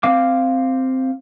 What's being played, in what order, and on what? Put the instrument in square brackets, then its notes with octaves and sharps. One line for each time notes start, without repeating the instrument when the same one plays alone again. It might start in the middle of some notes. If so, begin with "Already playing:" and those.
[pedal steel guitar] C4 F5 D6